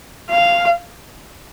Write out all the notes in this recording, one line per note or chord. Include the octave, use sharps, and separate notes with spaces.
F5